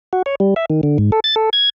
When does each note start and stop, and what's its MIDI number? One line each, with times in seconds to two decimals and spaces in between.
0.13 0.22 66
0.26 0.35 73
0.40 0.54 55
0.56 0.65 76
0.70 0.81 51
0.83 0.98 50
0.98 1.11 44
1.12 1.20 69
1.24 1.35 93
1.36 1.50 69
1.53 1.69 92